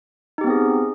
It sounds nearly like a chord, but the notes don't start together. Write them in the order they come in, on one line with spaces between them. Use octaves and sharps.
D#4 G4 B3 C4 G#4